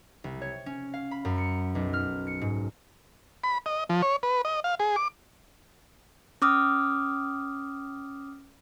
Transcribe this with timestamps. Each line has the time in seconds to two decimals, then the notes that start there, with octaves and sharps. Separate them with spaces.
0.24 C2
0.42 C#5
0.66 C#4
0.94 F5
1.11 B5
1.25 F#2
1.38 C#7
1.75 B1
1.93 F6
2.27 C#7
2.41 G#2
3.44 B5
3.66 D#5
3.90 F3
4.02 C#5
4.23 B4
4.45 D#5
4.64 F5
4.80 G#4
4.96 D6
6.42 C#4 D6 D#6 F6